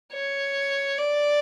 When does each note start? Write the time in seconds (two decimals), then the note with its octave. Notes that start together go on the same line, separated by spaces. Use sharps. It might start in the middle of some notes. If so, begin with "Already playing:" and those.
0.13 C#5
0.99 D5